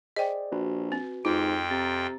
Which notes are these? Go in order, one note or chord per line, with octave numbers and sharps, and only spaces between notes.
G#4 C5 D5 D#5 G5
A#1 F#4 B4
C4
F2 G#2 F4 G5
C3 A#5 A6